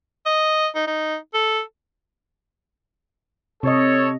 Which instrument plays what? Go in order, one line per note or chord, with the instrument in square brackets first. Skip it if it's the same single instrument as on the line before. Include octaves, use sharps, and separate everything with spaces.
[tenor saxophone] D#5
D#4
D#4
A4
[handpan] C3 D#5 [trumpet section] A4 C#5